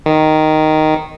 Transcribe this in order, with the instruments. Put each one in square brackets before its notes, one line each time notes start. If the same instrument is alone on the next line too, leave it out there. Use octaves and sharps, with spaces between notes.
[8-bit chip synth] D#3